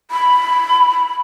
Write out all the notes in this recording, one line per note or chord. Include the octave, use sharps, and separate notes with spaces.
B5